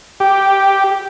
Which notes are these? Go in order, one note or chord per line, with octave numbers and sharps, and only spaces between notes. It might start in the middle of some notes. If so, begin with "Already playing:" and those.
G4